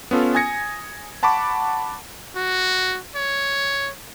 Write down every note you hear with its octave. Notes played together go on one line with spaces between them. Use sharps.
B3 C#4 F4 A4
G#5 D#6 G#6 A#6 C#7
F#5 A5 B5 C#6 D6
F#4
C#5